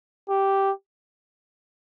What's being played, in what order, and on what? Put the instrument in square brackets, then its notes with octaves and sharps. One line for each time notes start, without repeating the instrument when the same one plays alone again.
[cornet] G4